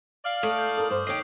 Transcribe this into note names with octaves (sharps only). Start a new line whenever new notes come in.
D5 F5 F6 F#7
A2 A3 C#6 D#6
G6
A4 A#4 D#6
G2 C5 D6
D#2 G4 C#5 D#5 C7